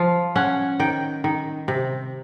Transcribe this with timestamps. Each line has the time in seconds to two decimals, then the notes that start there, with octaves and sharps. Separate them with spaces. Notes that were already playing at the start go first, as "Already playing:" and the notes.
Already playing: F3 F5
0.36 C#4 F#5
0.80 D#3 G5
1.24 D#3
1.68 C3